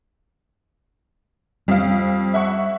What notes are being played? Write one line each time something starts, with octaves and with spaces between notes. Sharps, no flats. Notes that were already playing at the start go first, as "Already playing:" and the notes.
F2 G3 F5
E5 F#5 C#6